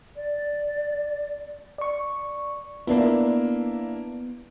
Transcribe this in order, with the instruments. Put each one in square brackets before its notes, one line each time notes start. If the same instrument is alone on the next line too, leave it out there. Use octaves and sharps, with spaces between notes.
[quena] D5
[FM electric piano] D5 C#6
[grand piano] A#3 D4 E4 [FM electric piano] B3